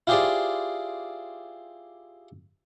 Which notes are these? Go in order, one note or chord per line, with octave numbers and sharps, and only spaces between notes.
E4 F4 G4 G#4 C5 D5